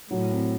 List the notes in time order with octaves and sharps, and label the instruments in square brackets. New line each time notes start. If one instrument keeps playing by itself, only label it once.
[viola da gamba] A2 [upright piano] F#3
[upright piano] C4